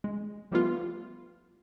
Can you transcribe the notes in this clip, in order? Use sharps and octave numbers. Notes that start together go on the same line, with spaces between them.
G#3
F3 G3 A3 B3 F4